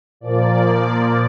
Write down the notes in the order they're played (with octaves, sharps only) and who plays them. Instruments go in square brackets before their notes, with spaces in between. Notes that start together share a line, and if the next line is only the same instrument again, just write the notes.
[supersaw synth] A#2 F3 A#3 D5